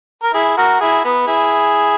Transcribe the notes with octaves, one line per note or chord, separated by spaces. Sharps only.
A#4
E4 G#4
F#4 A#4
E4 G#4
B3
E4 G#4